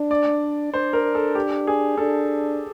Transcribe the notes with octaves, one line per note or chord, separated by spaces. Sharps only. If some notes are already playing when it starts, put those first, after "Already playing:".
Already playing: D4
D5
D4 C5
A#4
A4
G4
G#4
D4 A4